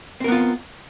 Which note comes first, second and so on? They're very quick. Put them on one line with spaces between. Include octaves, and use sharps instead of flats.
C4 A#4 B3 F4